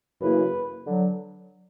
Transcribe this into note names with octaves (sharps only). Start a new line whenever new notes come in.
F#2 C#3 E3 A#3 E4 B4
D3 F#3